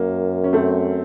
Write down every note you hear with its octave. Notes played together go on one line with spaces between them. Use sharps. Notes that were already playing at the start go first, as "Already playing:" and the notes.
Already playing: F#2 A#3
C#4
A3 C4